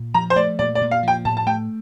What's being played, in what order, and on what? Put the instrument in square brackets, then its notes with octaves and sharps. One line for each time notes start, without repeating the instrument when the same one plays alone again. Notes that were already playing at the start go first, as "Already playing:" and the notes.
Already playing: [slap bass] A#2
[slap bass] F3 [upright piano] A#5
[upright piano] C5
[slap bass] A3 [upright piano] D5
[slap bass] A#2 [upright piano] D5
[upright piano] D5
[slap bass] A#2
[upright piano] F5
[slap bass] F3 [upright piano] G5
[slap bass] A2 [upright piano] A5
[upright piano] A5
[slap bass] A3 [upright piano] G5